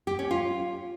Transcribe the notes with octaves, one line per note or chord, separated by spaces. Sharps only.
G4
C#4
F4